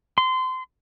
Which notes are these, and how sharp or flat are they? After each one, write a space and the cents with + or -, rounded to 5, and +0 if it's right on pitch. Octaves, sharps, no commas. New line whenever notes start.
C6 -25